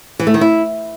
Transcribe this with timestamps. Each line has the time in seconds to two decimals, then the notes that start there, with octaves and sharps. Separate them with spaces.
0.19 E3
0.27 A3
0.34 D#3
0.41 E4